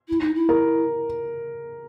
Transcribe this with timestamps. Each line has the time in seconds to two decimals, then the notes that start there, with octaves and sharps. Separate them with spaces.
0.09 E4
0.21 D#4
0.35 E4
0.49 A#4